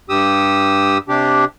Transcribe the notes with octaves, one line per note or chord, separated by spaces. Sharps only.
G2 G4 D#6 E6
C3 D4 G4